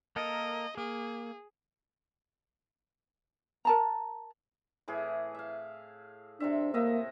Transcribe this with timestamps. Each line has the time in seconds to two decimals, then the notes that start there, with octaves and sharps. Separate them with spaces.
0.16 A#3 A4 A#4 D#5
0.77 A#3 G#4
3.65 A#4 A5 A#5
4.88 A2 E3 G#4
5.35 E5 F5
6.40 C3 C4 D4 E5
6.74 A2 A#3 D#5 E5